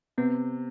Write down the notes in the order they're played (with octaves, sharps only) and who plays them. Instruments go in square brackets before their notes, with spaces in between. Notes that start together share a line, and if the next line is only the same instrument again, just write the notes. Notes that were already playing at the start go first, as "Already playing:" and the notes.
[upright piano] C3 [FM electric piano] B3